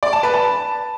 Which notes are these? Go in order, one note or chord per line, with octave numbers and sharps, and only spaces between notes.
D5
A5
B4
A5